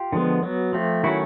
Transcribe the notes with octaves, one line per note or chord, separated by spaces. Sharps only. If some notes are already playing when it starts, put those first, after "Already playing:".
Already playing: F4 G4
D3 F3 G#3 B3
F#3 B3
F3 A3 C4
D#3 F#3 A3 C#4 E4 F#4